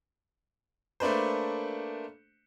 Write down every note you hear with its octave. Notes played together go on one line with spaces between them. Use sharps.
A3 A#3 D4 B4 C5